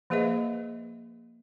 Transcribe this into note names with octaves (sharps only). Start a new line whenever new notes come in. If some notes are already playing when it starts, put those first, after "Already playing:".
F3 A#3 G#4 B4 D#5 E5